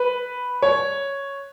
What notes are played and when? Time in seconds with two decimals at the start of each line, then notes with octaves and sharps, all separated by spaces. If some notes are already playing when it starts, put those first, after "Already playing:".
Already playing: B4
0.62 C#5